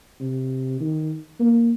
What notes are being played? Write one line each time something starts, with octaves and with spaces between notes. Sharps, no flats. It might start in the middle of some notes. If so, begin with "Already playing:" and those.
C3
D#3
A#3